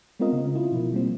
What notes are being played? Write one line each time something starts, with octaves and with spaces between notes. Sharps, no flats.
G#3 B3 C4 F4 A#4 D#5
C#3
E4 F4
B2 F3 E4
B2 G3 A#3 C4